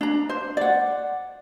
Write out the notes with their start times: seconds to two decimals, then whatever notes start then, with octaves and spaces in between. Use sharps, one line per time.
0.01 D4 A#5
0.29 C5
0.57 D5 F#5